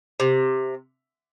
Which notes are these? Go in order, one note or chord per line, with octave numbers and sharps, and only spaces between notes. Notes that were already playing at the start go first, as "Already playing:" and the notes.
C3